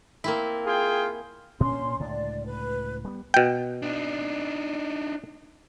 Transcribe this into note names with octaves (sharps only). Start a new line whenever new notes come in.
A#3 C4 E4
F4 G#4 G5
A#2 C#4 D4 C6
C#2 A2 D3 D5
B4
G3 B3
B2 G5
D4 D#4